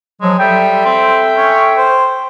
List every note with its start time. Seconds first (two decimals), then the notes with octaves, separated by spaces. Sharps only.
0.22 F3 F#3 G#3
0.39 G3 A4 E5 G5
0.85 C4
1.37 C#4
1.77 C5